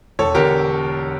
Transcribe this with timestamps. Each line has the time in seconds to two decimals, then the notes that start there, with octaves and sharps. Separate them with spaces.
0.19 E1 A4 C#5
0.35 E2 D3 G4 A#4